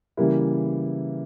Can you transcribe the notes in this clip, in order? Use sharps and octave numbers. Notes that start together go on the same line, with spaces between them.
C#3 E3 G3 A#3 E4